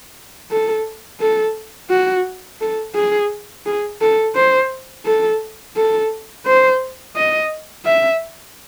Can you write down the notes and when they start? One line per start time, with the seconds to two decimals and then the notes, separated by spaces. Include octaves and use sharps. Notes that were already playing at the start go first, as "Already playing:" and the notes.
0.51 A4
1.21 A4
1.90 F#4
2.61 A4
2.95 G#4
3.66 G#4
4.01 A4
4.35 C5
5.05 A4
5.76 A4
6.46 C5
7.16 D#5
7.86 E5